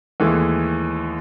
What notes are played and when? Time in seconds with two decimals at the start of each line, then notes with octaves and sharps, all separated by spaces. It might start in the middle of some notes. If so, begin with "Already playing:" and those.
0.20 D#2 E3 G#3 A3